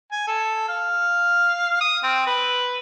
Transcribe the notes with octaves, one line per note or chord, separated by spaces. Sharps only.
G#5
A4
F5
D#6
C4
B4